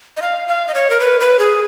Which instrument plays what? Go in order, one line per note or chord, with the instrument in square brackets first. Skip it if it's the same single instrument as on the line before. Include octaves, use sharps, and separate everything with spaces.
[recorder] D#5
F5
F5
D#5
C#5
A#4
B4
B4
G#4